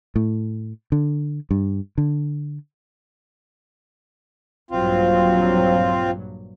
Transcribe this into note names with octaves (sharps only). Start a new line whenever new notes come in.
A2
D3
G2
D3
A#1 G2 F#3 C4 F4